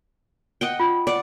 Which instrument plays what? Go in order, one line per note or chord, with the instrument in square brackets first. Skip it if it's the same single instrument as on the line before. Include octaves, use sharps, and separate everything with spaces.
[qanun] D#5 F#5 G5
[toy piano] F4
[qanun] D5 F#5